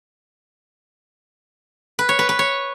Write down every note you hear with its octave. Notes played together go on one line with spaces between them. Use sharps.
B4
C#5
B4
B4
C#5